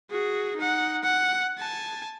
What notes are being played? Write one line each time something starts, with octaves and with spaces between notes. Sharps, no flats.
F#4 G#4
D#4 F#5
F#5
G#5 A5